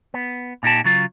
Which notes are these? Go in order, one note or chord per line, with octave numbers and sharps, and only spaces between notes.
B3
A#2 D#4 G4 A5
C#3 F#3 F4